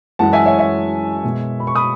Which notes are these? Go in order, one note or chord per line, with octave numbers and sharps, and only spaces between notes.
F#2 E3 G#3 F#5 A5
E5 G#5
C#5 E5
C#5 E5
B2 G#3 B3
B5
C#6
B5 D#6